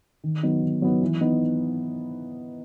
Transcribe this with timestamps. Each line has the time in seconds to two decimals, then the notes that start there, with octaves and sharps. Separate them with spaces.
0.24 D#3
0.43 F#3 B3 D#4
0.63 D#3
0.82 F#3 B3 D#4
1.01 E3
1.21 B3 D#4